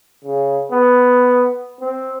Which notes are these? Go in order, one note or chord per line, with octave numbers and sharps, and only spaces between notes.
C#3
B3
C4